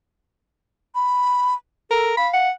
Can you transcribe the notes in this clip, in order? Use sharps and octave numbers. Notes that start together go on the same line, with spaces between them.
B5
A4 A#4
F5 B5
F#5